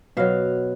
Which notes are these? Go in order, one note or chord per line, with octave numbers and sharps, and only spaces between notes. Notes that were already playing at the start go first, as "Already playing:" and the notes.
B2 F#3 F5